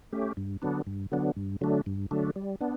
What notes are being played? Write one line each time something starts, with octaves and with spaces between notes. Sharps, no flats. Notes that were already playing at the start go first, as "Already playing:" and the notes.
A3 C#4 G4
G2
D3 F#3 B3 D4
G2
D3 F#3 B3 D4
G2
D3 F#3 A3 D4
G2
D3 F#3 A3 D4
G3
B3 D4